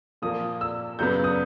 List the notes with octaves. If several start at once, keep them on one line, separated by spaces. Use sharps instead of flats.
A#2 F3 A#3 D#6
E6
F#2 C#3 F#3 B3 G6
D#6